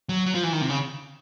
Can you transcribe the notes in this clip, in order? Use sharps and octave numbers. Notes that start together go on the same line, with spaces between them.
F#3
F#3
F3
E3
D#3
C3
C#3